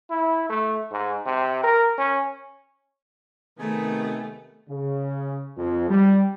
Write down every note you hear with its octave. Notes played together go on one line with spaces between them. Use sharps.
E4
A3
G#2
C3
A#4
C#4
C3 D#3 A3 B3 D#4 G#4 G#5
C#3
F2
G3